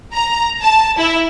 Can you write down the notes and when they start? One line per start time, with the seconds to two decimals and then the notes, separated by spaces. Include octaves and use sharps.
0.14 A#5
0.62 A5
0.98 E4